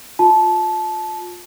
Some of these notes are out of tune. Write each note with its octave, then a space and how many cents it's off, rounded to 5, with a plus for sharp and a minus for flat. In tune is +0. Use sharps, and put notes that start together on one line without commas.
F4 +25 A5 -20